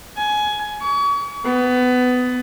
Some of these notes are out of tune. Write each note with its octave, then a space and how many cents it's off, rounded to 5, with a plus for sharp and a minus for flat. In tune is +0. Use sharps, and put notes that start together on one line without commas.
G#5 +20
C#6 +40
B3 +20